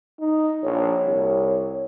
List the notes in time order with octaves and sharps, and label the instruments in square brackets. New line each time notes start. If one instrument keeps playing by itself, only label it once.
[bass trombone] D#4
[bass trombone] A#1 [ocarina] C#5
[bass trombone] C2